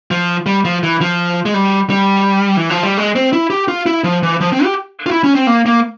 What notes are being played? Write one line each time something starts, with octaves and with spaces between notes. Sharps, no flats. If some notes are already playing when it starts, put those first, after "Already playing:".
F3
G3
F3
E3
F3
G#3
G3
G3
E3
F3
G3
G#3
C4
E4
G4
F4
E4
F3
E3
F3
C4
G4
F4
E4
C#4
C4
A#3
A#3